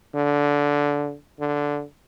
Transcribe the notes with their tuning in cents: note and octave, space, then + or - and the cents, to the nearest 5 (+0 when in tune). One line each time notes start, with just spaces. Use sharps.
D3 -15
D3 -10